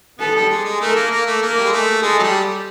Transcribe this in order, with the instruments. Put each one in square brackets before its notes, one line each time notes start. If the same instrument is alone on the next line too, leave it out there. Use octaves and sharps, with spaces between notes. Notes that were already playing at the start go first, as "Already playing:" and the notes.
[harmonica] B3 [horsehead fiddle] A4
[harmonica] G3
G#3
G#3
[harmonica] A3 [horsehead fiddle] A#4
[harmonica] A#3
A#3
A3
[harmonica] A#3 [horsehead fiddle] A#4
[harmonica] G3
G#3
A3
[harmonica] G#3 [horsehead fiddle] A4
[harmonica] F#3
G3